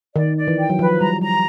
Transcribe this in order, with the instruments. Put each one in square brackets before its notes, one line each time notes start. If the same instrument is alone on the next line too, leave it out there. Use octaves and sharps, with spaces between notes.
[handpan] D#3 [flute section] D5
[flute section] D5
[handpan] E3
[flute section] G5
[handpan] F#3
[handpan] F3 [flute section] B4
[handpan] G3 [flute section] A#5
[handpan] G3 [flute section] A#5